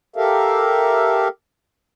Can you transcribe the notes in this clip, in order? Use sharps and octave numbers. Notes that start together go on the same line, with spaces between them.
G4 A4 A#4 E5 F5